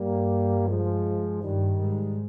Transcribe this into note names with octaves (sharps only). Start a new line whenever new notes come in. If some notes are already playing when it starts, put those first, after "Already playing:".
Already playing: G2 G3 A#3
F3 G#3
G2 D#3 G3
G#2